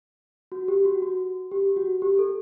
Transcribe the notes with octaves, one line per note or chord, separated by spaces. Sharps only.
F#4
G4
F#4
F#4
G4
F#4
G4
A4